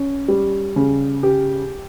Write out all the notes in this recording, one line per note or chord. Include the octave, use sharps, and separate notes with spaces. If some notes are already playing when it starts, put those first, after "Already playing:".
Already playing: C#4
G3
C#3
G4